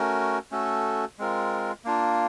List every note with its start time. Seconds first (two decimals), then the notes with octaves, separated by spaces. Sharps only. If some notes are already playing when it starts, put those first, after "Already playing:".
Already playing: A3 C#4 F#4 A#4
0.52 A3 C#4 F#4 A4
1.19 G#3 C4 F4 A#4
1.85 A#3 D4 F4